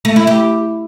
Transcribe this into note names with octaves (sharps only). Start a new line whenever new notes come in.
A3
E4
G4